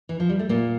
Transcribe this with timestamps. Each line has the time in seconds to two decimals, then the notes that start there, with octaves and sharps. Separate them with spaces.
0.09 E3
0.20 F3
0.29 G3
0.39 A3
0.49 A#2 A#3